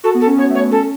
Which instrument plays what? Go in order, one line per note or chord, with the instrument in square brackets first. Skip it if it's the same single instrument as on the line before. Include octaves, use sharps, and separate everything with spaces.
[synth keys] F#4 [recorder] A4
[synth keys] B3
[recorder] A4
[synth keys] C#4
[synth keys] B3 [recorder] C#5
[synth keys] A3
[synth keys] B3 [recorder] C#5
[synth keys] C#4 [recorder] A4